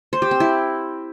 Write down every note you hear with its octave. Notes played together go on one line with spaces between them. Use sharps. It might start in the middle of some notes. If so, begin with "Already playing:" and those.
C5
G4
C4
E4